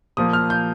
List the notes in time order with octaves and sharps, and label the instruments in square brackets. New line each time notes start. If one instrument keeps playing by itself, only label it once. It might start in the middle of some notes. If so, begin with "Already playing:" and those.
[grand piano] A#2 F3 A#3 D#6
F6
G6